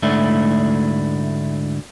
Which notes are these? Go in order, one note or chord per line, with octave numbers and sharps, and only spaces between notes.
D2 G#2 A3 D4 E4